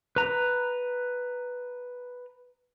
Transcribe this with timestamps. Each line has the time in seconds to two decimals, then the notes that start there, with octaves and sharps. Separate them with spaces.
0.16 B4 A#5